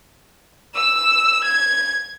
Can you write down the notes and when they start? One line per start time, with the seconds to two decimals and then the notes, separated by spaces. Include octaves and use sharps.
0.75 E6
1.44 G#6